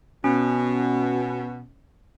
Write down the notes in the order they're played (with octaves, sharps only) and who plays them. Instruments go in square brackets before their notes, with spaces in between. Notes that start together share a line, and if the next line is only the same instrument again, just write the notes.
[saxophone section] B2 [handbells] C#4